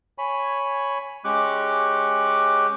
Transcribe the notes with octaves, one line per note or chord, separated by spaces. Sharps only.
C#5 G#5 B5
G#3 C#4 G4 C#6 D6 F#6